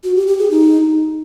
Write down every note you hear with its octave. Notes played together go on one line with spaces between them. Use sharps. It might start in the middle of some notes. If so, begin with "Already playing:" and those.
F#4
G4
G4
G#4
D#4